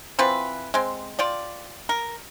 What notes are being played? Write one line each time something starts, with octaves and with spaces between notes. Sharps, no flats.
E3 C4 F4 B4
G#3 C4
F4 G4 D5
A#4